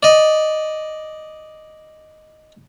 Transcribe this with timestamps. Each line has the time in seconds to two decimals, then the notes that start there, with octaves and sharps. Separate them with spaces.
0.03 D5 D#5